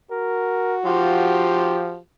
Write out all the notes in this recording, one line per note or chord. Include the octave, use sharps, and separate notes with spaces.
F#4 A#4
F3 F4 G4